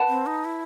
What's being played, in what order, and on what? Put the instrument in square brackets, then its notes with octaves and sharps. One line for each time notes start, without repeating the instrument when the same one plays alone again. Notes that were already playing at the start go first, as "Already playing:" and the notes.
Already playing: [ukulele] B4 F#5 A5
[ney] C4
D#4
E4